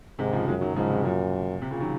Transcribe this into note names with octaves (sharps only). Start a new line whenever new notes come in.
G#2 C3 D#3
C#3 F3
F#2 F3 G#3
D#3 F#3
G#2 C#3 F3
C3
F#2 A#2
C3
A#2 C#3
D#3 F#3